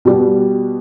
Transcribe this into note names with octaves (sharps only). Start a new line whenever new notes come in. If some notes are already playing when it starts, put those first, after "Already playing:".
B2 G3 B3